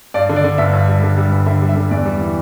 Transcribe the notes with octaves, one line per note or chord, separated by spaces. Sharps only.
G2 D5
D3
D5
D3
G1 E5
G2
G3
D3
G3
G1
D3 E5
G3
E5
D3
E2 D5
G3
E3